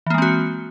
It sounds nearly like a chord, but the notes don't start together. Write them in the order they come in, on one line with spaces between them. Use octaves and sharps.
E3 A#3 G#3 C4 F#4